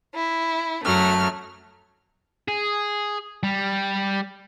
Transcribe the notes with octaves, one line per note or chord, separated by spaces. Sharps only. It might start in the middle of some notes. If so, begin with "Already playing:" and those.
E4
F#2 F#3 A3 F6
G#4
G3